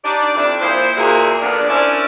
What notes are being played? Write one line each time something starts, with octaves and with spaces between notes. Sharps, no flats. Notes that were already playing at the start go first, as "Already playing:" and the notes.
D4 D#4 G4 D5
F2 D4 E4
A#2 E4 G#4 C5
E2 A#2 A#3 E4 F#4 G#4
A#2 D3 B3 D4 A#4 D5
C#4 D4 E4 A#4 C5 D5